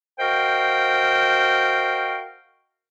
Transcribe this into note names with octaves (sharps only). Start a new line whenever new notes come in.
F#4 A#4 C5 D#5 F5 G5